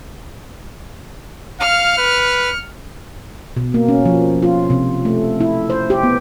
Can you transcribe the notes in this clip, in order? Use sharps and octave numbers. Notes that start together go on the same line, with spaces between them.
F5 F6 C#7
B4
B2
A#3
C#4
F3
F4
C3
A3
E4
C5
G4
B3